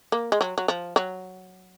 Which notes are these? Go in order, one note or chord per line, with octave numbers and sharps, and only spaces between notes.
A#3
G#3
F#3
F#3
F3
F#3